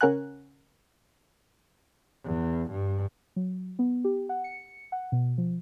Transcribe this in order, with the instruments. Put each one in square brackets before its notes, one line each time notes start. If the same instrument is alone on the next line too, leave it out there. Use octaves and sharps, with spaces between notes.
[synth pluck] C#3 C#4 A#4 F#5 G#5 F#6
[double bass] E2
G2
[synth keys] F#3
B3
G4
F#5
C#7
F#5
B2
F3